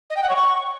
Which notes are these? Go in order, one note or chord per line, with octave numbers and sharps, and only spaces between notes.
D#5
G5
F#5
C#5
C#6